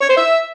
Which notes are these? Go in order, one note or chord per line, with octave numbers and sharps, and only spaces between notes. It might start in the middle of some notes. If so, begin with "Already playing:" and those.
C#5
C5
E5